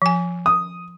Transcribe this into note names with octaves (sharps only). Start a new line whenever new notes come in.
F3 G#5
D#6